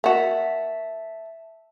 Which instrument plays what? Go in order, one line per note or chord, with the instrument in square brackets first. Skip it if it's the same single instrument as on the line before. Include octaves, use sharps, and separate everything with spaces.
[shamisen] A#3 F#4 [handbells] E5 A5